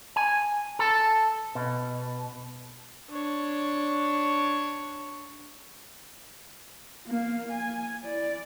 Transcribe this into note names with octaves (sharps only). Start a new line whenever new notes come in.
G#5
A4
B2
D4 C#5
A#3 F5
G#5
E4 D5